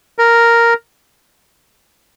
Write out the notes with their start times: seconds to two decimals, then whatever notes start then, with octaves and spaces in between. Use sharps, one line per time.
0.19 A#4